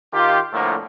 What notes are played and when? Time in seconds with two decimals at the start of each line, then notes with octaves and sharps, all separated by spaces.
0.13 D#3 F4 G4
0.53 C2 A2 D3 F3 A3 A#3